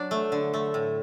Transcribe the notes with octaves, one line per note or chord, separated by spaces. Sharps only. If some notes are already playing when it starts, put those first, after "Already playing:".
Already playing: F#3 D4
A3
D3
A3
A2